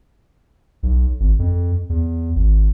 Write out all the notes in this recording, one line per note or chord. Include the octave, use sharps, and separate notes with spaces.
B1
G#1
F2
E2
G#1